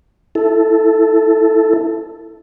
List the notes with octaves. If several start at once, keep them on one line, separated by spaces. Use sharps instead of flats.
E4 A4